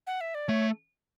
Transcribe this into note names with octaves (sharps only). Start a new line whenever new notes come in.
F#5
E5
D5
A3 C#5